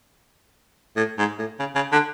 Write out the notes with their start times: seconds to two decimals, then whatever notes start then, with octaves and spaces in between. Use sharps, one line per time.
0.96 A2
1.18 G#2
1.39 A2
1.60 C#3
1.76 C#3
1.92 D3